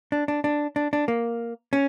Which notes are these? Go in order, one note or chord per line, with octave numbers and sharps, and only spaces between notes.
D4
D4
D4
D4
D4
A#3
C#4